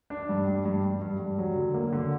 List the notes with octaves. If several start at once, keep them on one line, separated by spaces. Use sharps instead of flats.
D4
G2
G2
G2
G2
G2
G2
F#3
D3
A#3
D3